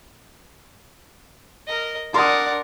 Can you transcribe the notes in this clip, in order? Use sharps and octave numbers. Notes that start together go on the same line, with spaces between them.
A#4 D#5
D4 A#4 D5 F#5 C6 D#6